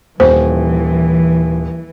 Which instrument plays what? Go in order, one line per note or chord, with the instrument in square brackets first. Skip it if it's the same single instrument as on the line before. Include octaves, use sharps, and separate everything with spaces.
[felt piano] D#1 [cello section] E3 [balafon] C5